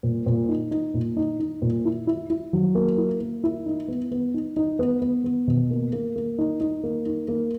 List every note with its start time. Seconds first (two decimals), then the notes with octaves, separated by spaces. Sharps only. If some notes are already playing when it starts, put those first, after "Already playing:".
0.03 A#2
0.26 A#2
0.49 D#4
0.71 D#4
0.94 A#2
1.17 D#4
1.40 D#4
1.62 A#2
1.85 E4
2.07 E4
2.30 E4
2.53 F#3
2.75 A#3
2.98 E4
3.21 A#3
3.44 E4
3.66 D#4
3.88 B3
4.11 B3
4.34 D#4
4.56 D#4
4.79 B3
5.02 B3
5.24 B3
5.47 B2
5.70 A#3
5.93 A#3
6.16 A#3
6.38 D#4
6.61 D#4
6.83 A#3
7.06 D#4
7.28 A#3